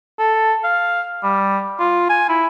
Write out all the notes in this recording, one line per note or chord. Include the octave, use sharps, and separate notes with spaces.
A4
F5
G3
F4
G#5
E4